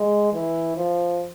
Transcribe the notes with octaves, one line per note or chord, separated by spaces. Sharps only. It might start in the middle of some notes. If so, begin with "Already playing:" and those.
Already playing: G#3
E3
F3